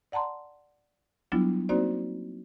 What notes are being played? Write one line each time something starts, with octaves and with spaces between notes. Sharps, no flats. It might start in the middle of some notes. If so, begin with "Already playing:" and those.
D5 F#5 A5 A#5 C6
F#3 G3 B3 D4 E4 F4
A#3 C4 D#4 F#4 C5 D5